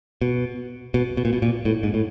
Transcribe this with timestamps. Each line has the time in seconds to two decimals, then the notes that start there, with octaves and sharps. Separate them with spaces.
0.22 B2
0.94 B2
1.17 B2
1.25 A#2
1.33 B2
1.42 A#2
1.65 A2
1.83 G#2
1.94 A2